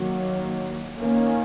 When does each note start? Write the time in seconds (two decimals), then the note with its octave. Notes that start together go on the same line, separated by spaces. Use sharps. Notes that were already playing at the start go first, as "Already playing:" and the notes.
Already playing: D#3 F#3 A#3
0.98 D#3 A#3 C#4